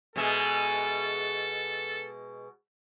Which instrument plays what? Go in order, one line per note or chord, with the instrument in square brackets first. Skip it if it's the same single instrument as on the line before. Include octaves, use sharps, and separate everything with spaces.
[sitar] B2 G#3 E5 [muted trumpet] A4